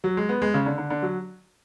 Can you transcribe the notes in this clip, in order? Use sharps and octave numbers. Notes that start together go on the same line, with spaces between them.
F#3
G#3
B3
G#3
C#3
D3
D3
D3
F#3